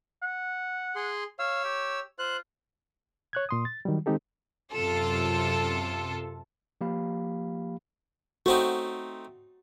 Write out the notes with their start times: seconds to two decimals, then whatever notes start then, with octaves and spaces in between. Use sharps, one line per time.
0.22 F#5
0.96 G#4 C6
1.39 C#5 F5 E6
1.64 G4
2.19 F4 C5 F#6
3.33 C#5 F#6 G#6
3.49 A#2 C6 D#6
3.65 A6
3.85 D#3 F#3 G3
4.06 D#3 G#3 C4 D#4 G4 A4
4.74 F#2 C3 F4 A4
6.81 F3 A#3 G4 F5 B5
8.46 A3 C4 D#4 F#4